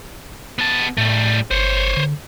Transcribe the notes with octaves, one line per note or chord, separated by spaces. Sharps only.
B3 A5
A2 G3 A3
G1 C5 C#5
D3